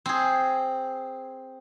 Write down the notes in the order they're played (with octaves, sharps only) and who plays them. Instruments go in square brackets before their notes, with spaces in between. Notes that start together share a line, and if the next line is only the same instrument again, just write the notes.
[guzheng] C4 G#4